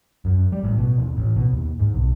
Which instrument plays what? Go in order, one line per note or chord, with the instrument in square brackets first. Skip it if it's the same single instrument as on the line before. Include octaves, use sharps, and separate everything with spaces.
[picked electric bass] F#2
G3
A1
B2
D#1
A1
B2
D#2
G#2
B1